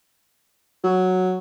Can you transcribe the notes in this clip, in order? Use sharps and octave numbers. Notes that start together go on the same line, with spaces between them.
F#3